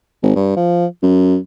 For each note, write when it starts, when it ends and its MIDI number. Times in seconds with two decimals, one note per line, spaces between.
0.23 0.34 32
0.35 0.56 43
0.56 0.86 53
1.03 1.37 42